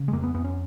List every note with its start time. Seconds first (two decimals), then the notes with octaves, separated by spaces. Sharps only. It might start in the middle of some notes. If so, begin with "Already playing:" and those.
Already playing: C#3
0.08 G#3
0.13 F2 A#3
0.24 B3
0.34 F2 B3
0.44 C#4